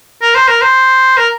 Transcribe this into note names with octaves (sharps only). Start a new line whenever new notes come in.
A#4
C5
A#4
C5
A#4